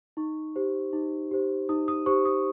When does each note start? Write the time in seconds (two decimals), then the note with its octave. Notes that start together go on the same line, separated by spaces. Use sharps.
0.17 D#4 C#6
0.56 G4 C5
0.93 D#4
1.31 G4 C5
1.69 D#4 D#6
1.88 D#6
2.06 G4 C5 C#6
2.25 D#6